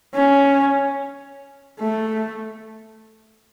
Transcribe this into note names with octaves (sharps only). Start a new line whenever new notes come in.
C#4
A3